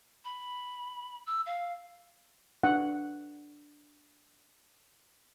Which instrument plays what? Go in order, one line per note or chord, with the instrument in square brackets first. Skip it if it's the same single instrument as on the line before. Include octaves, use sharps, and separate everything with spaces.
[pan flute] B5
E6
F5
[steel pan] D4 F#5